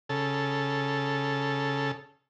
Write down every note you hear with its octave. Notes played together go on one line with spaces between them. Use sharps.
C#3 A4